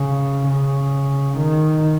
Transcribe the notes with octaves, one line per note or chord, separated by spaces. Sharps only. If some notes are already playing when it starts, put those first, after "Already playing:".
Already playing: C#3
C#3
D#3